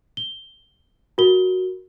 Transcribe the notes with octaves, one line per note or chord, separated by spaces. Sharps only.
G7
F#4 A#4 G7